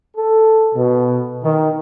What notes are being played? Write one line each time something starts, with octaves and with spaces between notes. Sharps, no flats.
A4
B2
D#3